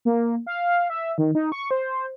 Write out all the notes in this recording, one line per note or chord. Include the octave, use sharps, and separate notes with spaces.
A#3
F5
E5
D#3
D#4
C#6
C5